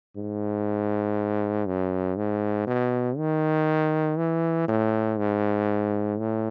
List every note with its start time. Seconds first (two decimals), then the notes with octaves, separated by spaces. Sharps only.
0.16 G#2
1.66 F#2
2.17 G#2
2.67 B2
3.17 D#3
4.18 E3
4.68 A2
5.19 G#2
6.19 A2